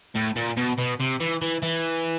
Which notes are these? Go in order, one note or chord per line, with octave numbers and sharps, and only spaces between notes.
A2
A#2
B2
B2
C3
E3
E3
E3